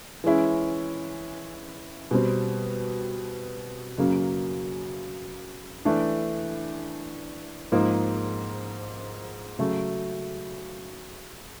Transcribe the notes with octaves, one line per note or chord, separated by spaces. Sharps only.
E3 G#3 C#4 E4
B2 G3 C4
F#2 C#3 F#3 A#3
E3 A3 D4
G#2 F3 A#3 D#4
C#3 F#3 A3